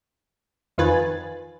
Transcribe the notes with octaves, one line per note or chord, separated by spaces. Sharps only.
F2 D#3 F4 B4 G#5 A6